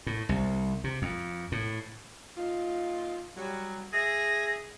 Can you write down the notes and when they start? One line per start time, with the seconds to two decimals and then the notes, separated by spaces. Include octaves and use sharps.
0.07 A2
0.29 C2
0.84 C3
1.02 F2
1.52 A2
2.36 A#2 D#4 F4
3.37 F#3 G3
3.93 G#4 E5 A#6